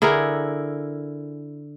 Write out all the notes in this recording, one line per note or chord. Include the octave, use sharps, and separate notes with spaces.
D3 E4 G#4 A#4